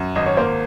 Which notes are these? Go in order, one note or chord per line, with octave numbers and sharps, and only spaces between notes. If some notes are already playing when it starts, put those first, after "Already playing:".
Already playing: F#2
G#1 D#5
C#5
A#3 C5